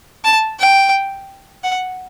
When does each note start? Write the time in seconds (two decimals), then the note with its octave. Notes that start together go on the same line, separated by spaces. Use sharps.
0.24 A5
0.60 G5
1.64 F#5